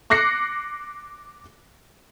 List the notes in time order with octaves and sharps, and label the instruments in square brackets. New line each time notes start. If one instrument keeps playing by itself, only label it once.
[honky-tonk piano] D6 F#6 A#6 C7 C#7